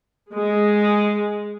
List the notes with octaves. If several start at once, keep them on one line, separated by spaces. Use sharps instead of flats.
G#3